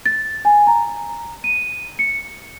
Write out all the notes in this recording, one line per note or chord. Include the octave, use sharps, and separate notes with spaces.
A6
G#5
A#5
D#7
C#7